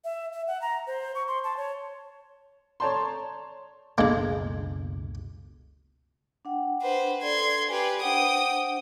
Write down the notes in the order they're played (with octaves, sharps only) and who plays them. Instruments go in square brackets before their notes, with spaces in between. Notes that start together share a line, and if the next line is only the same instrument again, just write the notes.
[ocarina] E5
E5
F#5
A#5
C5
C#6
C6
A5
C#5
[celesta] A4 D5 A#5 [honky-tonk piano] C#5 A5 C6
[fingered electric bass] F#1 C#2 B2 [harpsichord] G#3 A#3 [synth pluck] D4 A4
[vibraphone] D4 F#5 G5
[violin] B4 C5
[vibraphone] A4 D5 [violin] C6 G#6
[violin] G4 B4 [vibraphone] G#5
[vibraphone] D4 C5 F#5 [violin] G5 D#6